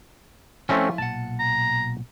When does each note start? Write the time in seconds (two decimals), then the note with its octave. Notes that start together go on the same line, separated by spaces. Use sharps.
0.69 F3 A3 C4 C#4 E4 F4
0.98 B1 A#2 F#5 A5
1.40 A#5